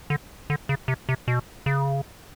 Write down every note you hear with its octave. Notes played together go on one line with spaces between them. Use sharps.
D3
D3
C#3
C3
C3
B2
C#3